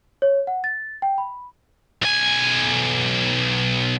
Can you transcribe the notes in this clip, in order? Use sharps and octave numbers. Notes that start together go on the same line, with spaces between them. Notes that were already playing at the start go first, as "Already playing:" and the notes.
C#5
F#5
A6
G5
B5
B1 G#5